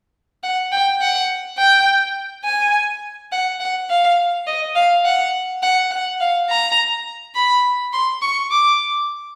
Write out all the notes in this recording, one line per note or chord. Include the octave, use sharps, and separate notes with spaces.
F#5
G5
F#5
G5
G#5
F#5
F#5
F5
D#5
F5
F#5
F#5
F#5
F5
A#5
B5
C6
C#6
D6